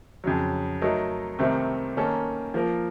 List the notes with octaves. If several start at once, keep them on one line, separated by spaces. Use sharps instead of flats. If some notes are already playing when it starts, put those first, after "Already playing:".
F2 C#3 F#3
F#3 A3 D#4 A#4
C2 C3 D#3 A3 C4
D#3 A#3 C#4 A4
F3 A#3 F4 A#4